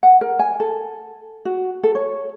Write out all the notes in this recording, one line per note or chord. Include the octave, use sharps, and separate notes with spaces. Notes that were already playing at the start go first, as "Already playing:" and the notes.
F#5
A#4
G#5
A4
F#4
A4
C#5